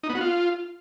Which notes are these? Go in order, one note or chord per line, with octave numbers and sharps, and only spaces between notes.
D#4
B3
F#4
F4